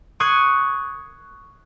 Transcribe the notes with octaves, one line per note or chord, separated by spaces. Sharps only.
C#6 D#6 F#6 G#6 C7 D#7